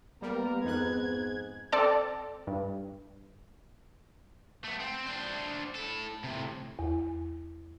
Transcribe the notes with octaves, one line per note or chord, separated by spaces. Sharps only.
G3 A#3 B3 A#4
F2 G#2 D#4 F#6 G#6
C4 A4 D5 A5
G2
A3 B3
C4
D4 C5
E4 A4
A2 C3
E2